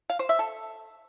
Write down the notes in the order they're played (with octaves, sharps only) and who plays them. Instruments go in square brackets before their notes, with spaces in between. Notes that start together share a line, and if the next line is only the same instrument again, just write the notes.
[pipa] F5
C5
E5
A4